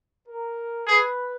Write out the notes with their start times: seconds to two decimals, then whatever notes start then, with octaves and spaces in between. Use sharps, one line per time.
0.27 A#4
0.87 G#4 B4